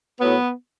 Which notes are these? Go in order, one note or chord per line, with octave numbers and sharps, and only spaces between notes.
A2 F#3 B3